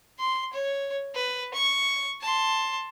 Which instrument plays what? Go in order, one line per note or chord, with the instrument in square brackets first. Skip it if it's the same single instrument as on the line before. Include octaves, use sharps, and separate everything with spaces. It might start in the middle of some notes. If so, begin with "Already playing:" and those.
[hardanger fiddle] C6
C#5
B4
C#6
A5 C6